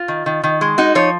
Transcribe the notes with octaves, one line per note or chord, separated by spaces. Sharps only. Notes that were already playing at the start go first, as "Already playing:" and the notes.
Already playing: F4
D#3
D#3
D#3
G#3
D#4 F#4
F3 C#5